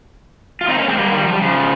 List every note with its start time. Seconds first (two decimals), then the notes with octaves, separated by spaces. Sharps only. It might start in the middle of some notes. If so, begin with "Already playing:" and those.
0.61 F4
0.68 C4 D#4
0.78 A#3 C#4
0.88 G#3 C4
0.98 G3 A#3
1.12 D#3 G3
1.26 F3
1.33 G3
1.41 C#3 F3